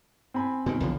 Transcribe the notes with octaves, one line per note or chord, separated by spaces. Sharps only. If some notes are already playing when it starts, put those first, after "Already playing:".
C4 G#5 B5
B2 D#3
B1 D3 F3